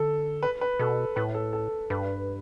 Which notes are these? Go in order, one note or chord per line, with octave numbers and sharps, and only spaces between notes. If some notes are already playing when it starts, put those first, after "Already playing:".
Already playing: D3 A4
B4
B4
B2 A4
A2 B4
A4
A4
G2 B4